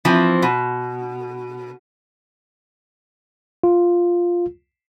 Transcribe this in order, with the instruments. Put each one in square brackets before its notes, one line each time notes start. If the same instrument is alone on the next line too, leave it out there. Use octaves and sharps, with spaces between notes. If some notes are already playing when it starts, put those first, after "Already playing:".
[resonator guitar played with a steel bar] E3 F3 C4
B2
[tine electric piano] F4